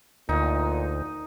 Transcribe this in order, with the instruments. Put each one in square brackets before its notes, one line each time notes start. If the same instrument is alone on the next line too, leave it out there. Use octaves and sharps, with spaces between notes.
[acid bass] D2 [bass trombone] A#2 [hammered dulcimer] D#4